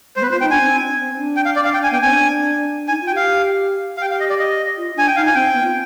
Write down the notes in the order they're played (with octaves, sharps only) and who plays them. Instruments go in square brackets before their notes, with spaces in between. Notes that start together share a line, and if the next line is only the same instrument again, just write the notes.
[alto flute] G#3 [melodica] C5
[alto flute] B3 [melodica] B4
[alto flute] F4 [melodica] C5
[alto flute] D#4 [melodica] G5
[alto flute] D4 [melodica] G#5
[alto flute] C4
C4
D4
[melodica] G5
F5
D5
F5
G5
G#5
[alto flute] B3 [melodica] G5
[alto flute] C4 [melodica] G#5
[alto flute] D4
[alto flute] D#4 [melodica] G#5
[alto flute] F4
[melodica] G5
[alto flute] G4 [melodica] F5
[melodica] F5
[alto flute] G4 [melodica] G5
[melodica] F5
D#5
D5
D#5
[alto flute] F4
[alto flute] D4 [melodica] G#5
[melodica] G5
[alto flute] D#4 [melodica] F5
[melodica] G#5
[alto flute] C4 [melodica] G5
[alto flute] B3
F4